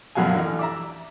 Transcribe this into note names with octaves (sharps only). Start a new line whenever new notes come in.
A#1 F#2 B2 F#3 F5 G#5
A1
D5 E5 A#5